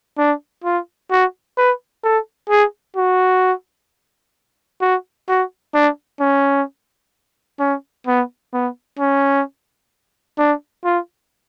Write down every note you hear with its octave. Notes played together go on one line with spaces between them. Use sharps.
D4
F4
F#4
B4
A4
G#4
F#4
F#4
F#4
D4
C#4
C#4
B3
B3
C#4
D4
F4